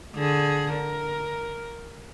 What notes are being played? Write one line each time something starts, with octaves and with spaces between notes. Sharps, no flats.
D3 G#4
A#4